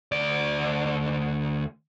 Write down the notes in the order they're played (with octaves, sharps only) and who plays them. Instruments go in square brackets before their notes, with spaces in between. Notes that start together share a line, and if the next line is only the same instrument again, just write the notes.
[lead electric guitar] D2 D5